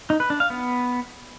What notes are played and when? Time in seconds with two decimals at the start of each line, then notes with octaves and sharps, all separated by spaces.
0.10 D#4
0.20 B4
0.30 D4
0.40 F5
0.50 B3